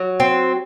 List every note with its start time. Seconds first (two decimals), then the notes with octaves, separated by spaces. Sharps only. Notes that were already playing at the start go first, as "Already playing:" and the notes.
Already playing: F#3
0.20 C4